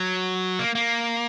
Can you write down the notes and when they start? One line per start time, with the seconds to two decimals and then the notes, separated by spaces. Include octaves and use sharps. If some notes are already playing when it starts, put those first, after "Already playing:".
Already playing: F#3
0.59 A#3
0.75 A#3